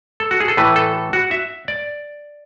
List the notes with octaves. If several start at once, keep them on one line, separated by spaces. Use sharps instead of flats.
A4
F#4
G#4
A4
A2 E3 A3 B4
A4
F#4
E5
D5